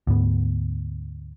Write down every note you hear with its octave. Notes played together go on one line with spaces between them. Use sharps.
D2 G#2 B3